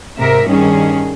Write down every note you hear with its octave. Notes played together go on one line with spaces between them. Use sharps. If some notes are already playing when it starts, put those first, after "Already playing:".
G#2 C3 A#4 E5
G2 D#3 C#4 G#4